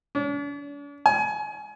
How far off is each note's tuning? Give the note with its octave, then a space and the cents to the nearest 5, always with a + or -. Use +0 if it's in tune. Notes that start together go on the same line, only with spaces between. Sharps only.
D4 -45
G#5 +25